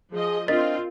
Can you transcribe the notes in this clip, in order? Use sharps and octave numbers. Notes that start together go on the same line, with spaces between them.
F3 G#4 D#5
C4 D4 F4 A#4 D#5 A6 B6